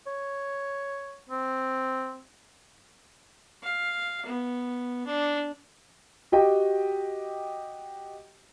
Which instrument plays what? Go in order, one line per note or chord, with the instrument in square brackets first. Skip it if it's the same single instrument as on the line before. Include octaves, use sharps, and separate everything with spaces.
[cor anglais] C#5
C4
[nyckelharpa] F5
B3
D4
[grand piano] F#4 G4 D#5 G5